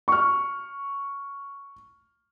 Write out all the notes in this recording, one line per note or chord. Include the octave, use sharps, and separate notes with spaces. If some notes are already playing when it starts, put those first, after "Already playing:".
C#6 F6